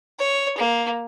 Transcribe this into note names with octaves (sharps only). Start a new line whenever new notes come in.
C#5
A#3